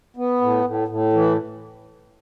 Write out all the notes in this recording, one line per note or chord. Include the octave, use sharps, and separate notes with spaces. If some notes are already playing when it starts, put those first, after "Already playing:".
B3
A2
A2
A2
E3